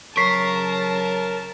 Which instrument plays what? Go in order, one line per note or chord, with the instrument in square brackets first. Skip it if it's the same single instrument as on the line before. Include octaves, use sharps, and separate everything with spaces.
[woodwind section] C#3 F#3 [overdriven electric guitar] A#4 [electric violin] A5 [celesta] C#6 B6 C7